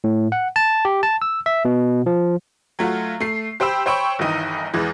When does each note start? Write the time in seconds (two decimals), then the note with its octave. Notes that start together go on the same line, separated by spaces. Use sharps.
0.04 A2
0.32 F#5
0.56 A5
0.85 G4
1.03 A5
1.22 E6
1.46 E5
1.65 B2
2.06 F3
2.79 F#3 A3 F4 F#4
3.20 A3 C7
3.60 G4 C5 G5 B5 E6
3.86 C5 C#5 G5 B5 C#6
4.19 G1 D#3 E3 D#4 D#7
4.74 E2 E3 G#3